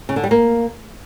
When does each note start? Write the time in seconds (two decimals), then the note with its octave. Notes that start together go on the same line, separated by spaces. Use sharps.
0.09 C#3
0.16 D3
0.24 G3
0.31 A#3